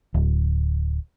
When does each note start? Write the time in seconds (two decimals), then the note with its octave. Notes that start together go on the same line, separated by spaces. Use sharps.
0.14 D1